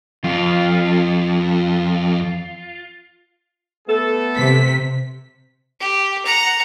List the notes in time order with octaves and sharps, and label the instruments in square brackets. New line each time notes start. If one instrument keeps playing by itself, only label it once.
[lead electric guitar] F2 [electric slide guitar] F4
[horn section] A3 B3 A4
[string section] C3 B6
[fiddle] G4
F#5 A#5